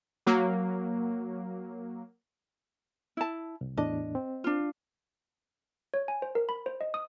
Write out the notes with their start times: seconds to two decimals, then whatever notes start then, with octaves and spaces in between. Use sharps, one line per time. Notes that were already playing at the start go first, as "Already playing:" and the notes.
0.26 F#3 A#3
3.17 E4 A5
3.61 C2
3.77 E2 A2 D4 D#5
4.15 C4
4.44 D4 F4
5.94 C#5
6.08 G#5
6.22 C5
6.35 A#4
6.49 B5
6.66 C5
6.81 D#5
6.94 D#6